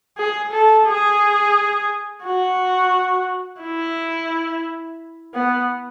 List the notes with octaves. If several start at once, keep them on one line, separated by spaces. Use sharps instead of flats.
G#4
A4
G#4
F#4
E4
B3